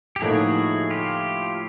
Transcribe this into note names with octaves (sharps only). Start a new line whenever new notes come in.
G4
A2 F3 A#3 D#4 F#4 G#4
F4 G4